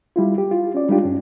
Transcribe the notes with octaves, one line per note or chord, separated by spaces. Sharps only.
G3 E4 F4
G4
F4
C#4 D5
G3 G#3 D4 D#4 F4 G4
G2 C#4